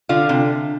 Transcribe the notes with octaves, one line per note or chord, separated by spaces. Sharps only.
D3 F4
C3